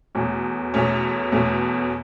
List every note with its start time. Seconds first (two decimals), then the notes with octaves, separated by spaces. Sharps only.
0.15 E2 B2 A3 C#4
0.74 E2 B2 A3 C#4
1.32 E2 B2 A3 C#4